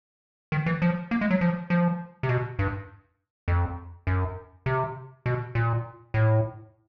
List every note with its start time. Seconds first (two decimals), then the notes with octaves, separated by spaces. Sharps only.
0.52 D#3
0.66 E3
0.82 F3
1.11 A#3
1.21 G#3
1.31 F#3
1.41 F3
1.70 F3
2.23 C3
2.29 B2
2.59 G2
3.48 F2
4.07 F#2
4.66 C3
5.26 B2
5.55 A#2
6.14 A2